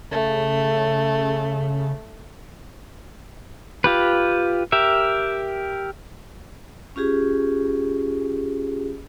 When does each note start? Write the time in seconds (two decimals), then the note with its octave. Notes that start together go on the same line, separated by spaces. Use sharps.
0.11 C#3 A3
3.84 F4 G4 B4
4.72 G4 A#4 E5
6.96 C#4 F4 G4 G#4